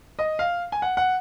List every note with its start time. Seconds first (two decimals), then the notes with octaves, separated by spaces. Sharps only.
0.19 D#5
0.39 F5
0.72 G#5
0.82 F#5
0.97 F#5